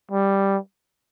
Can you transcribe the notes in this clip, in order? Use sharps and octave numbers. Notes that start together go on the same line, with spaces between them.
G3